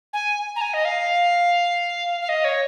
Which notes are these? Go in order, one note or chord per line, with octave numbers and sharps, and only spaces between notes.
G#5
A#5
G#5
D#5
F5
F5
D#5
C#5